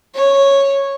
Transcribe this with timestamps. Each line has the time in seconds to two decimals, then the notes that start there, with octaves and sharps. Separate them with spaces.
0.15 C#5